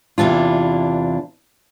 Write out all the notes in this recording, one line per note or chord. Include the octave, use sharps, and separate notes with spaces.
E2 C3 E3 D4 F4